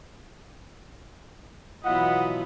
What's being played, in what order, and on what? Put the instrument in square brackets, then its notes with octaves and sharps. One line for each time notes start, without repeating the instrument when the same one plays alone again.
[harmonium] B2 F#3 F4 [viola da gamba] E3 B3 E4 [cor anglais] D#5 [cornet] F#5